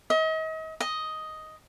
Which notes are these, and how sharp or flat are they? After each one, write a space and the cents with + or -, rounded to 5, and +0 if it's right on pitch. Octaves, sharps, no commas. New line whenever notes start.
D#5 +40
D#5 +5